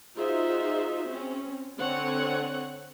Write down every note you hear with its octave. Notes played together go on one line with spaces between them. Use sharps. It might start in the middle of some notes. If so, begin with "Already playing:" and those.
D#4 F4 F#4 G#4 C5 E5
C4 C#4
D3 C4 C#5 F#5